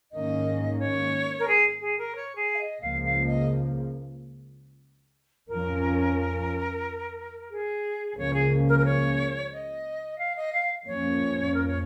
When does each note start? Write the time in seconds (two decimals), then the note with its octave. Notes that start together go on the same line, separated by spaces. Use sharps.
0.12 G#2 D#3 A#3 C#4 D#5
0.80 C#5
1.39 A#4
1.47 G#4
1.81 G#4
1.97 A#4
2.14 C#5
2.36 G#4
2.54 F5
2.59 D#5
2.81 C#2 C#3 F3 A#3 F5
3.04 F5
3.26 D#5
5.49 F2 F3 C#4 A#4
7.52 G#4
8.18 C#2 C#3 F3 A#3 C#4 C#5
8.35 G#4
8.68 A#4
8.79 A#4
8.85 C#5
9.53 D#5
10.19 F5
10.36 D#5
10.53 F5
10.87 F2 F3 A#3 C#4 C#5
11.54 A#4
11.66 C#5